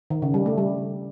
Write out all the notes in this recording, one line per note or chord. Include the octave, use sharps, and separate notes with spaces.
D#3
C#3
G3
A3
G3